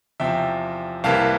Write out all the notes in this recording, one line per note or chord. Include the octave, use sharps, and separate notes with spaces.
E2 C3 F3 E5 G5
C2 C3 E3 A#3 F5 A5